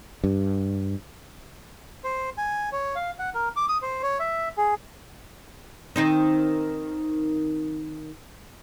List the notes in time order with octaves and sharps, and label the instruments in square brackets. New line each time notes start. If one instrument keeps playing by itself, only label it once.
[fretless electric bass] G2
[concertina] C5
G#5
C#5
F5
F#5
A#4
D6
D#6
C5
C#5
E5
G#4
[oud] D#3 C4 D#4